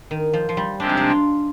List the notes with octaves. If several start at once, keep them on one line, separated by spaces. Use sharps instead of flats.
D#3
F3
F3
G3
C3 F3 G#3 C4 D4 G4
D#4
D4
F4